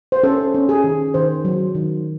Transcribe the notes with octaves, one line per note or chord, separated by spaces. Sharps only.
C5
C#4 A4
C#4
G#4
D#3
D#3 C5
F#3
D#3